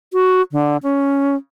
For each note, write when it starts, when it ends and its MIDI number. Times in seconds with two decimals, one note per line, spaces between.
0.13 0.42 66
0.52 0.77 50
0.83 1.35 61